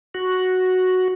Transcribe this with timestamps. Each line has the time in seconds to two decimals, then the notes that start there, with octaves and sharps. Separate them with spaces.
0.15 F#4